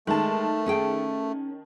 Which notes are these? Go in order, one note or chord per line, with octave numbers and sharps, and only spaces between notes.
D#3 G#3 A3 A5
C#4 G#4 G5